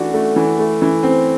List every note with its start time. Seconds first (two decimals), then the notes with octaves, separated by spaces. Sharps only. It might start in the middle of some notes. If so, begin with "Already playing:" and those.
Already playing: E3 A3 D4 F#4
0.14 A3
0.36 E3
0.59 A3
0.82 E3
1.03 C4